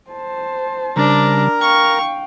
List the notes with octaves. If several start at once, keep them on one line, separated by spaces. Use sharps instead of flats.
C5 A5
C#3 G3 D4 A#4 A#5
F5 G5 C#6 F6